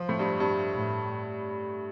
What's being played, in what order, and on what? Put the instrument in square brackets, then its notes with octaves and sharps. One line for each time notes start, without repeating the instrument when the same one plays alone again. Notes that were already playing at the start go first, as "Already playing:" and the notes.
Already playing: [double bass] F3
[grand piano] A2
G2
G2
[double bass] A2